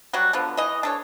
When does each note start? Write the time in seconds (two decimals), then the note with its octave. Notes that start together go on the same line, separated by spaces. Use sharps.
0.13 F#3 G3 F#4
0.33 D3 F3 B3
0.57 E3 D#5
0.83 D4 A4 C#5